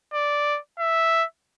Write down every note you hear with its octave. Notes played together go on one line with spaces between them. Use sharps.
D5
E5